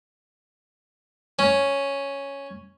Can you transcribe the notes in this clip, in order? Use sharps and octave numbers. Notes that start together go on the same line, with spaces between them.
C#4